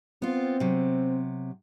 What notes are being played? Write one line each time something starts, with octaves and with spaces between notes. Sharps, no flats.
B3 C4 F4
C3 F#3